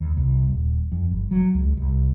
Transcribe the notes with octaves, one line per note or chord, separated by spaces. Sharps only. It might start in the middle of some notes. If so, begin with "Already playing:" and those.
D#2
C2
D#1
F2
G1
F#3
C#2
C2